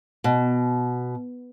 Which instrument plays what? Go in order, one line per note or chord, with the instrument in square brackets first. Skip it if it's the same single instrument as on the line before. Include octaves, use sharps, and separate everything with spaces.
[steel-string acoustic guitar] B2